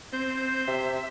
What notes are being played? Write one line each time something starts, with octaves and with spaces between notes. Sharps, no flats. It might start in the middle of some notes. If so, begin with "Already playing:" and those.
C4 C5 G6
C3 E5